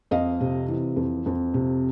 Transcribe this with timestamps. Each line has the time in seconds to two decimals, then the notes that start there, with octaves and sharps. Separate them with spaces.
0.11 F2 D#5 F5
0.41 C3
0.68 E3
0.96 F2
1.26 F2
1.54 C3